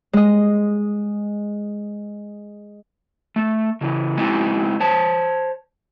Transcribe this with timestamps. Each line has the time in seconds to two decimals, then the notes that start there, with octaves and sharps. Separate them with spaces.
0.13 G#3 D#5
3.36 A3
3.81 C#3 E3
4.17 G#3 C4 D#4 E4
4.80 C5 C#5 A5